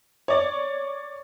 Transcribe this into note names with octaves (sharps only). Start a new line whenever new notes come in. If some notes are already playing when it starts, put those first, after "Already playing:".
C#5 D5